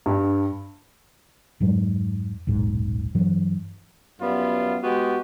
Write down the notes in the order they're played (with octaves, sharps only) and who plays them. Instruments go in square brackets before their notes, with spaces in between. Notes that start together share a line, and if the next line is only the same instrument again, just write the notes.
[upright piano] G2
[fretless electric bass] F2 G#2 F#3 G#3
D#1 B1 G#2
G2 E3 F#3
[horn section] F#2 G3 B3 F4
G#3 B3 F#4 G4